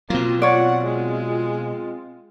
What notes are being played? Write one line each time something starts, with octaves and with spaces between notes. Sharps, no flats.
B2 F#3 A#3 C4 F4
C#5 D5 F#5
G#3